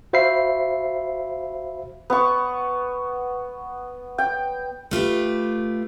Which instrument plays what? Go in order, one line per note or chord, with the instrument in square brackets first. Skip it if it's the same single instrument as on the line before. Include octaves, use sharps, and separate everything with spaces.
[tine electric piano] F#4 C5 E5 F5 B5 C7
[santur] B3 C#6
G5
[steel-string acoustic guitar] A3 F4 G4 B4